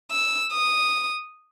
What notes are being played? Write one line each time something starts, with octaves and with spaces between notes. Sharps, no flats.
E6
D#6